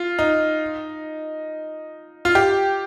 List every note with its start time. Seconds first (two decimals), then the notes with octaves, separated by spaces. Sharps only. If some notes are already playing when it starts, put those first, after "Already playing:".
Already playing: F4
0.19 D#4
2.25 F4
2.35 G4